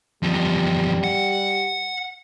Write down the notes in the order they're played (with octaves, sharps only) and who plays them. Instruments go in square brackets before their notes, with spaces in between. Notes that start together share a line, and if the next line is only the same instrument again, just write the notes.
[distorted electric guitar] E2 F3 [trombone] G3
[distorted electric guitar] F#5